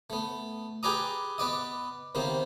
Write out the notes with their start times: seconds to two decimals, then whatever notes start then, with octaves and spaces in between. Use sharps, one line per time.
0.10 A3 B3
0.83 G4 G#4 B4 D5 A#5 D#6
1.38 B3 B4 D5 D#5
2.15 D#2 C3 D#3 A#3 B3